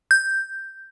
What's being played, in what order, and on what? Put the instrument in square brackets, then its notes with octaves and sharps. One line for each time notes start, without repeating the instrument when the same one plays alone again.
[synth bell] G6